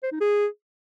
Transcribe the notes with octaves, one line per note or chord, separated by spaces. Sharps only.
C5
D#4
G#4